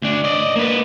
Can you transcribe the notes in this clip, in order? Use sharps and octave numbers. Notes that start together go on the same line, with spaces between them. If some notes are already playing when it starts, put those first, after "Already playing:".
D2 D4
D5 D#5
A#3 B4